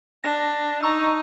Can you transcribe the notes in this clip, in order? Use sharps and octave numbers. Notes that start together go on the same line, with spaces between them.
D4 A#6
D#4 A#5 C#6 E6